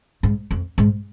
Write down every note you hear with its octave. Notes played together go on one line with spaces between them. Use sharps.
G#2
F2
G#2